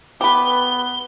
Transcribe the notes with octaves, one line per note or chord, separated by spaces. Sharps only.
B3 G4 B4 G7